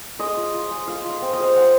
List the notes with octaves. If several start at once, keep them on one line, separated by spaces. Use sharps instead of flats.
G#3 D#5
F4
F4
G#3
F4 F5
F4
F5
C4
D#5
G#3
F5
G#3 F#5